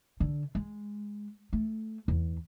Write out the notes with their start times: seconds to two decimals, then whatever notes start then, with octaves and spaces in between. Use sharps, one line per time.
0.20 D3
0.55 G#3
1.53 A3
2.08 E2